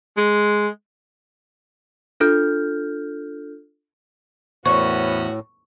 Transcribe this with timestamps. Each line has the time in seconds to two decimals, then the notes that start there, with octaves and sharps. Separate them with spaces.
0.18 G#3
2.20 D4 F4 A4 F6 G6
4.66 E2 A2 B3 C#4 F#4 C5 C#6